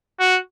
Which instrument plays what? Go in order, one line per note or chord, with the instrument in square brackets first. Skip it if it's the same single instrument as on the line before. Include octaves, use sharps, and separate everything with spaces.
[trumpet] F#4